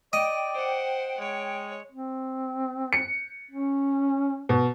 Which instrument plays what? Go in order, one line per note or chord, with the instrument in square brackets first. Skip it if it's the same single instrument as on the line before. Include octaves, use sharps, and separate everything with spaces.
[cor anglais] D5 [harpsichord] D#5 [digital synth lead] G5
[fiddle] C5 F#5
[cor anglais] G#3 [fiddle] C#5
[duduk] C4
[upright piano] C#7
[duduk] C#4
[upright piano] B2